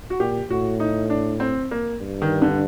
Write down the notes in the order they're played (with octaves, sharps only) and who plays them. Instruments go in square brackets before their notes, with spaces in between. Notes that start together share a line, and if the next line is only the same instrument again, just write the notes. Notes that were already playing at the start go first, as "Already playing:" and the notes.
[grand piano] F#4
[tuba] A#2 [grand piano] G4
[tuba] A2 [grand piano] F#4
[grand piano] D#4
D4
C4
A#3
[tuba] G2
[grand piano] D#3
D3